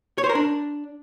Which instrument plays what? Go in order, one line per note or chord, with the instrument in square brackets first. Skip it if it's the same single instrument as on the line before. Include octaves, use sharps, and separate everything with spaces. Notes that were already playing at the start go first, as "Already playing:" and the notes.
[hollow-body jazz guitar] C#5
C5
A#4
D4